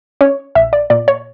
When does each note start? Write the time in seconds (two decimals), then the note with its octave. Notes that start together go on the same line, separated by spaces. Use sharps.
0.21 C#4 C#5
0.55 A#1 E5
0.73 D5
0.90 A#2 D5
1.08 C#5